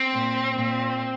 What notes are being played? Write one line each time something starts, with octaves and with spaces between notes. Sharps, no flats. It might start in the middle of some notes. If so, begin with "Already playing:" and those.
Already playing: C4
A#2
A#2